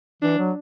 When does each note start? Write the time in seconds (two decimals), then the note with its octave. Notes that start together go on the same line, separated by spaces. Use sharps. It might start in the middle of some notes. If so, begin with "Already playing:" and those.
0.22 E3 D4
0.38 F#3